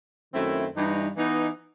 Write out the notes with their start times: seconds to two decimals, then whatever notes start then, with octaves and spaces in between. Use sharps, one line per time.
0.33 F#2 D#3 A3 C4 E4
0.74 G2 E3 G3 D#4
1.16 E3 B3 D#4